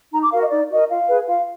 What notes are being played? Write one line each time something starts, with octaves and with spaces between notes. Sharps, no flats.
D#4 A#5
D6
F#4 A#4 F5
D#5
D#4 D5
F#4 A#4 D#5
F4 F5
G#4 B4
F4 F5